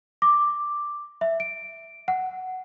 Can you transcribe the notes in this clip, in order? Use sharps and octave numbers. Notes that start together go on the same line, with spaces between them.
D6
E5
D7
F#5